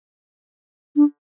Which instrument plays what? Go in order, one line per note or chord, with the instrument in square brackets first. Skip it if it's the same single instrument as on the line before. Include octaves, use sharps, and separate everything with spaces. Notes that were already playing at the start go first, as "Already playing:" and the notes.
[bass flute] D4